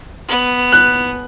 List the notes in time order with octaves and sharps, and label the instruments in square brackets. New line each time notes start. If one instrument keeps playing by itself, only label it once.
[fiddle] B3
[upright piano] F#6